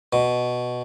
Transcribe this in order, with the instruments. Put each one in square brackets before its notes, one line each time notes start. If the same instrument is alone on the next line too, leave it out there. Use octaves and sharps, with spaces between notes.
[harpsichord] B2